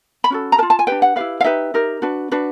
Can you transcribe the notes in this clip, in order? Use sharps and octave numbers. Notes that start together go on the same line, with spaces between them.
B5
C#4 F#4 A4
A#5
A#4 A5
F4
A5
G#5
D4 G4 B4 G5
F#5
E4 G4 B4 F5
F5
D#4 G4 B4 E5
D#4 G4 A#4
D4 F#4 B4
D4 F#4 B4